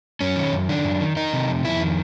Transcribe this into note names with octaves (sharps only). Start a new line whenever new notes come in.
F#2 C#4
D#3
F#2
D#3 D4
F#2
D#3
D#3 D#4
C3
F2
F2 E4
D#3